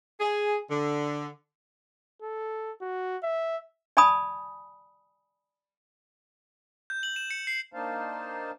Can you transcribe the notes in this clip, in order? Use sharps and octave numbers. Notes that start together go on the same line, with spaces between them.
G#4
D3
A4
F#4
E5
D5 G#5 A5 B5 D#6
G6
F#7
E7
C#7
C7
A#3 D4 D#4 C5 F5 A5